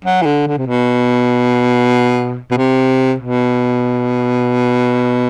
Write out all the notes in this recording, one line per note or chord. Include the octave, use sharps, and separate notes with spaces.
F#3
E3
D3
D3
C3
B2
B2
C3
B2